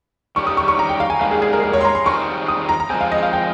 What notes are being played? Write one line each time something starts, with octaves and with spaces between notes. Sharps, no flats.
D#3 G3 C#4 G4 C#6
D#6
C#6
C#6
A#5
G5
F5
G#5
G#2 D#3 G3 A#3 F5
G#4
G#4
A#4
A#4
C#5
C6
A#5
C6
D#3 G3 C4 F4 G#4 C#6
D#6
A#5
A#5
F3 G#3 C4 G#5
F5
D#5
F5
G5